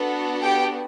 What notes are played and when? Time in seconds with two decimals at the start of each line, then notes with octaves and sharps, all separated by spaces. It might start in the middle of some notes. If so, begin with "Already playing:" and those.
Already playing: B3 D4 F#4 A4
0.42 G4 G5